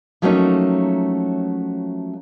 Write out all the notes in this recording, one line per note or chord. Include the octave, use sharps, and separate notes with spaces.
F3 F#3 A3 A#3 C#4 D#4